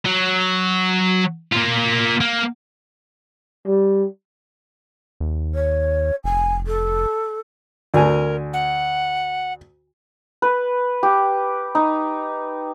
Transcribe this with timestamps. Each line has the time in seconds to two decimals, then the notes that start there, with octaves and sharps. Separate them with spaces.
0.05 F#3
1.52 A#3 F4
2.21 A#3
3.67 G3
5.20 D#2
5.55 C#5
6.24 F1 G#5
6.67 A4
7.94 D2 A#4 G#5
8.53 F#5
10.42 B4
11.03 G4
11.75 D#4